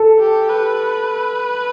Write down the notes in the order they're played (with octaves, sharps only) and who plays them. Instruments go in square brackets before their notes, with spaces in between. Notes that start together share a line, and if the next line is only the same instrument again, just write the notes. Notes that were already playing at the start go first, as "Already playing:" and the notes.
Already playing: [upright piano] A4
[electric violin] G4
B4